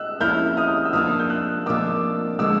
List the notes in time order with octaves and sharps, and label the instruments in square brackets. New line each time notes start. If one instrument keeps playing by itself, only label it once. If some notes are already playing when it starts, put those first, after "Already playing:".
Already playing: [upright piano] E6 F#6
[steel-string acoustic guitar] F3 A#3 C#4 E4 [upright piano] F6 G6
[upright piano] D#6 F6
D#6
E6
[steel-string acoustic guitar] F3 A#3 D4 [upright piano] D#6 F6
[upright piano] G6
E6 F#6
[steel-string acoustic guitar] F3 A#3 D4 [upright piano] D6 E6
[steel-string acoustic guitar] D3 F3 G#3 [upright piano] D6 E6